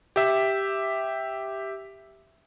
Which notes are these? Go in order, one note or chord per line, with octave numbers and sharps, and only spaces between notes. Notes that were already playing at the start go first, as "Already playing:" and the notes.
G4 E5